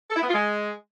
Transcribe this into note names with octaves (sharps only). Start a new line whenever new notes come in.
A4
E4
B3
F4
G#3